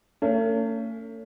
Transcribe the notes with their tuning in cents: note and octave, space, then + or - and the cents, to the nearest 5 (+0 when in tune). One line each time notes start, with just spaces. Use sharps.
A3 +45 C#4 +25